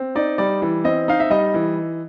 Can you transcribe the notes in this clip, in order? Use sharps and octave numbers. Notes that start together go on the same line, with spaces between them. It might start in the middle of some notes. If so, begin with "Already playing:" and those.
Already playing: C4
D#4 D5
G3 D5
E3
C4 D#5
D#4 F5
E5
G3 D#5
E3